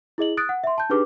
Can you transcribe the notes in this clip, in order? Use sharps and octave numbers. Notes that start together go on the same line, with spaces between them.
E4 G#4 D#5 F#7
D#6 F#6 A6 D7
F#5
E5 C6
A5 G6
D4 D#4 G4 G#4 B4 D6